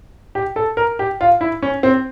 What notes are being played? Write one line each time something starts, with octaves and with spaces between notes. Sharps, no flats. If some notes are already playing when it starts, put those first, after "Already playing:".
G4
A4
A#4
G4
F4
E4
C#4
C4